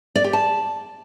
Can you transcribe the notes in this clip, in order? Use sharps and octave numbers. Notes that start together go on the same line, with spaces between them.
D5
G4
A5